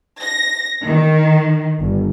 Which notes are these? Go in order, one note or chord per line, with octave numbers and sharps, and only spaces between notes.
A#6
D#3
G1